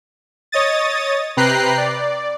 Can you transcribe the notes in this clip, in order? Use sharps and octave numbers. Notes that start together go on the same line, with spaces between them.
C#5 D#5 D#6 A6
C3 B4 G5 A#5 F#6 C7
D5